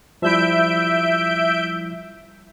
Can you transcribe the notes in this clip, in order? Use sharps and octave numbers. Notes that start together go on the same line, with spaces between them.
F3 G3 E4 E5 G6 D7